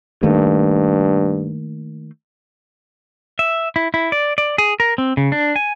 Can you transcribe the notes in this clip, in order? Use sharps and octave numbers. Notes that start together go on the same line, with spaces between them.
G2 D#3 A3 A#3
E5
E4
E4
D5
D5
G#4
A#4
C4
C#3
D4
G#5